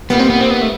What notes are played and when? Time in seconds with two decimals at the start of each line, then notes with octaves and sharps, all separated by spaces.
0.10 A#2 G3 A#3 B3 D#4
0.19 C4
0.30 B3
0.41 C4
0.51 B3
0.62 A3